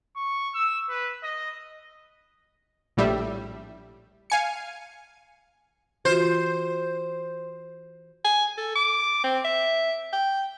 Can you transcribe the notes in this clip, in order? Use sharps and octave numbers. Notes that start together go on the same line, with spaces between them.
C#6
E6
B4
D#5
A#1 A2 G3 E5
F5 G#5 C#7
E3 F4 F#4 C5
G#5
A4
D6
C4
E5
G5